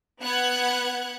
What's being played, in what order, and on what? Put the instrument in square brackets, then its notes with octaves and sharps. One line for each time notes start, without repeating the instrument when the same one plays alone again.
[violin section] B3 F#5 F#6 G#6